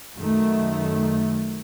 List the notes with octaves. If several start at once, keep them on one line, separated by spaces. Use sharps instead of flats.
F#2 D#3 A3